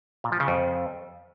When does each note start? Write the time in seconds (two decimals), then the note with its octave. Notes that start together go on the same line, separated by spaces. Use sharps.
0.24 A#2
0.32 F3
0.40 C#3
0.48 F2